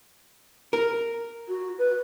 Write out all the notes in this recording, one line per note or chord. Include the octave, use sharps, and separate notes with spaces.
A#4
F#4
B4